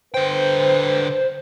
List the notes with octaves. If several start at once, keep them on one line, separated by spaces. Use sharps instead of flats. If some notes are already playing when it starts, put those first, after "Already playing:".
D3 B4 C5 G5